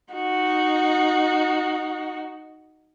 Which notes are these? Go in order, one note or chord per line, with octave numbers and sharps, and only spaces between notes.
D#4 F#4